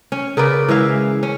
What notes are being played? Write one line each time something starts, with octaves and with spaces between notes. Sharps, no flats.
C#4
C#3 A#4 B4 D5
E3 G#3 E5 F5
C#4